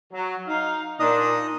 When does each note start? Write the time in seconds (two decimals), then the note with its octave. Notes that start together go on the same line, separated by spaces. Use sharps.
0.12 F#3
0.47 D#4 F5
0.99 A#2 D4 D#4 D#5 D#6